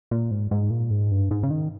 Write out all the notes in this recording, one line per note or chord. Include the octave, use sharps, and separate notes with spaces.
A#2
G#2
G#2
A#2
G#2
G2
G#2
C#3
D#3